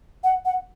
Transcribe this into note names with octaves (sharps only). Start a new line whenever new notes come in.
F#5
F#5